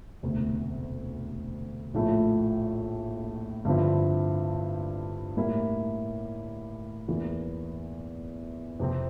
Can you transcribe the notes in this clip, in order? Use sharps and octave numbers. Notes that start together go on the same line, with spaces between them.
E1 D2 C3
A#1 A2 F3 A3 E4
G2 D3 F3 C4 E4
A2 G3 A#3 E4
E2 E3 A#3
F2 C3 F3 C4